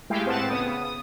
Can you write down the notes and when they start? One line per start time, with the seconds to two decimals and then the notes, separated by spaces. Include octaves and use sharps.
0.10 G#3 A3 E4 G4 F5 G5
0.26 A2 C4 B4 F#5 A5 E7
0.50 C#3 B3 D#6
0.81 D#6